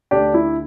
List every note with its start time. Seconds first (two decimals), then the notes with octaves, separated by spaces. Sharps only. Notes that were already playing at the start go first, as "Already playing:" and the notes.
0.11 D2 D4 G4
0.34 E4